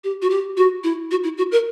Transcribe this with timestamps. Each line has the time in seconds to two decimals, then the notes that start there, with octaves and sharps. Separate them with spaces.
0.04 G4
0.22 F#4
0.30 G4
0.57 F#4
0.84 E4
1.11 F#4
1.24 E4
1.37 F#4
1.52 A#4